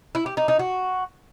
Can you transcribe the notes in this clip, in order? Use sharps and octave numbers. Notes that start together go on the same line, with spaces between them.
E4
G4
D#4
D#4
F#4